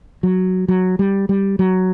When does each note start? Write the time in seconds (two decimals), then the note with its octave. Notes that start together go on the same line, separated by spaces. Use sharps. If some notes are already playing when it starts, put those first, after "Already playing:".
0.23 F#3
0.68 F#3
0.99 G3
1.29 G3
1.59 F#3